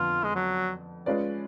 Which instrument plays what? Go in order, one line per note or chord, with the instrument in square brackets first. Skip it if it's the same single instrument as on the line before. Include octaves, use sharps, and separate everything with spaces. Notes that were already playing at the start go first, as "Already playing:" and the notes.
Already playing: [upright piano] F2 D3 B3 [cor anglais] F4
[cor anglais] G#3
F#3
[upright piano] G#3 C#4 F4 B4 D5